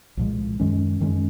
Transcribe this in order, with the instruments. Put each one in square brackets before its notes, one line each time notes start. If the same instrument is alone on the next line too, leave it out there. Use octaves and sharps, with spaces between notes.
[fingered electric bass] C2 A#2 F3 G#3
F#2 D#3 G#3 C#4
F#2 D#3 G#3 C#4